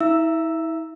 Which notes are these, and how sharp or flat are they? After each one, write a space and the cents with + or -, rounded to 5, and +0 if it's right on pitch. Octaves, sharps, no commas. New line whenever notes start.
E4 -35 E5 +25 E6 +0